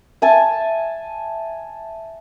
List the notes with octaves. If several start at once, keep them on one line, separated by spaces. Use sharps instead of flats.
E5 G#5 A5